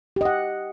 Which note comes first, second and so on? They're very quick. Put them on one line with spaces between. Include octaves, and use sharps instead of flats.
G4 D#5 F#5